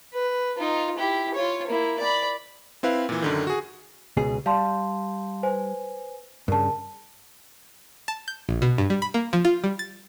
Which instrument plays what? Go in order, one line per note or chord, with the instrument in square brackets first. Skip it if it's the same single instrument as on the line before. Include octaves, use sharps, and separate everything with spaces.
[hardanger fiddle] B4
D#4 F4
E4 G4
F4 C#5
A#3 E4
D5 B5
[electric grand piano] C4 E4 B4 F5
A#2 E3
F#2 D3 D#3
F#4 G#4
[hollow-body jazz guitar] C#2 B2 G#4
[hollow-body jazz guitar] G3 [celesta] F5 A5 C6
[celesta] B4 C5 G#5
[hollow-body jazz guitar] G2 C#3 [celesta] A#4 A5
[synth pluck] A5
G6
A#1
B2
G2
G3
B5
A#3
F3
F4
G3
A6